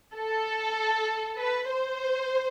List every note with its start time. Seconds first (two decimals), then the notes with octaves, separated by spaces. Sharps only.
0.15 A4
1.39 B4
1.69 C5